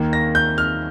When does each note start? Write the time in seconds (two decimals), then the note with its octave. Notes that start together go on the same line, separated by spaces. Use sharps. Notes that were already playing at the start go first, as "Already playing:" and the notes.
Already playing: D#2 D#3 A#3
0.13 A#6
0.35 G6
0.58 F6